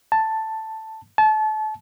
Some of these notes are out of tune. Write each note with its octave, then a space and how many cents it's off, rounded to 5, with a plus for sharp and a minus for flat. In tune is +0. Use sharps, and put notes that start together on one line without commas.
A5 +5
A5 -30